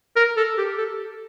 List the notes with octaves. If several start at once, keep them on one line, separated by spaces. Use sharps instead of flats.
A#4
A4
G4
A4